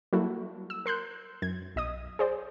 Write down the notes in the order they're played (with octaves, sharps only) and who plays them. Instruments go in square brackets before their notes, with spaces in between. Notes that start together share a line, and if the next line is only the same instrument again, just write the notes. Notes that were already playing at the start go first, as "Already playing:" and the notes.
[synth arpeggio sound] F#3 G3 A#3 E4 F#4 A4
E6
A#4 C6 F#6 G6
F#2 G#6
B1 D#5 D#6
G#4 C5 D5